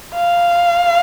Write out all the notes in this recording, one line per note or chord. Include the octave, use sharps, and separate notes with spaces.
F5